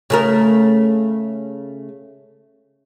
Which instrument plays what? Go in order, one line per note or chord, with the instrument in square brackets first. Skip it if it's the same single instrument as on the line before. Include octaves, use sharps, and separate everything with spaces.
[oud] C#3 A3 A#4